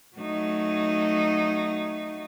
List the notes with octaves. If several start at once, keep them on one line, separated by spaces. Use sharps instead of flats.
F#3 A3 D#4